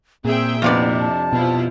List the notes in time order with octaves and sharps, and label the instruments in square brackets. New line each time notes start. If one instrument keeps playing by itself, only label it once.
[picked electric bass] A#2 [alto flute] C4 [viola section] G#4 E5 G5
[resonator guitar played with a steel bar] F2 C3 D5 [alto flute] B3 [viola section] D4 E4
[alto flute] A5
[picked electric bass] B2 [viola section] F3 E4 F4